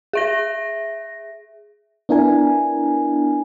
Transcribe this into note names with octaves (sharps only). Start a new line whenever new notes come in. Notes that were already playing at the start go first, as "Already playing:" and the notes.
G#4 E5 A#6
B3 D4 E4 A#4 G#5